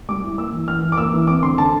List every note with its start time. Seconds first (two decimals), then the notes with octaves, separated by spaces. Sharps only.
0.09 G3 D6
0.24 E4
0.38 A#3 E6
0.53 E3
0.68 E3 F6
0.83 E3
0.92 D6
0.98 A#3 E6
1.13 E3
1.27 C4 D6
1.43 D3 C6
1.58 D3 A5